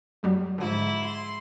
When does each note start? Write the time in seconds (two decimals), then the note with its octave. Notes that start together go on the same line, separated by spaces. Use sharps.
0.23 F#2 F#3 G3
0.58 G#2 D3 F3 E4
1.05 C6